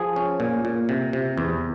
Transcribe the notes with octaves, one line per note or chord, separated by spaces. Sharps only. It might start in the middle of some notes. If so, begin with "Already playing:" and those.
Already playing: F3 G#4
C#4
A#2
A#2
C3
C3
E2